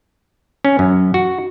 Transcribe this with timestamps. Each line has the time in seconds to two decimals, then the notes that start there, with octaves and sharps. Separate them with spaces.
0.65 C#4
0.79 F#2
1.14 F#4